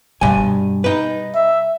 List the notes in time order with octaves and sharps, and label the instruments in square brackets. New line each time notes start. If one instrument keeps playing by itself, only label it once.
[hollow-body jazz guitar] G2 G#5 [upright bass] B2 G3
[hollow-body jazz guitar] D#4 B4
[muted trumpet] E5